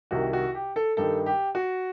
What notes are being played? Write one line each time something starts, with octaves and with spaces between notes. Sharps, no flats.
C2 C3 D#3 F#4
F#4
G4
A4
G2 D#3 A4
G4
F#4